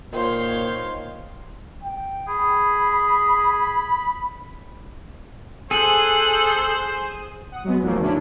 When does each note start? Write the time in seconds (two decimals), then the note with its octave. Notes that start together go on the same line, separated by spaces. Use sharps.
0.13 A#2 D#3 C5 C#5 F5 C6
1.83 G5
2.28 G#4 B5
5.71 G#4 A4 C5 F#6
7.52 F#5 D#6
7.64 F#3 G#3 B3
7.82 E2 G#2 F3 F#3 A3 A#3
8.00 D3 C#4 D4 E4